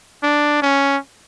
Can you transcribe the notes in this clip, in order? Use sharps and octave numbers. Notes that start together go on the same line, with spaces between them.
D4
C#4